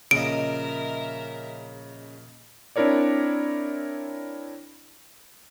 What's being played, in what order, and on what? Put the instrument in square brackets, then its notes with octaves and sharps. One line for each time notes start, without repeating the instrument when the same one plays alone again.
[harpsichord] A#1 D#5 [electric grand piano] C#3 [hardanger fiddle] A#4 E5 [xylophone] D7
[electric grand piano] C4 D4 E4 A#4 C#5 D5